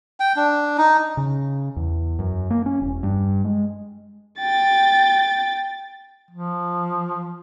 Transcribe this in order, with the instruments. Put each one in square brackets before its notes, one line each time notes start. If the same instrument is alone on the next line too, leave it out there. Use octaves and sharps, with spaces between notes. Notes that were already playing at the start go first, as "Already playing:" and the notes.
[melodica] G5
D4
D#4
[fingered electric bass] C#3
E2
F#2
A#3
C#4
E1
G2
G#3
[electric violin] G5 A6
[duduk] F3